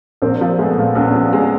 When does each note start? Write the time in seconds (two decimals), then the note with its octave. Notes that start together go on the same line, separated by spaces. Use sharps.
0.22 A#1 A#3 C4
0.41 F3
0.59 G#3 A3 B3
0.78 A#2
0.95 A#1 B3 C#4
1.14 F3
1.33 G#3